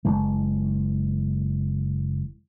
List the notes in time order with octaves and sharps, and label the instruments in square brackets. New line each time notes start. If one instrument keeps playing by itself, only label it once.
[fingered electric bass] F#1 E3 G#3